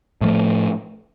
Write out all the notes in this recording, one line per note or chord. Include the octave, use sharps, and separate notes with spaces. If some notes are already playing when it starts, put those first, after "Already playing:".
A2 F3 A3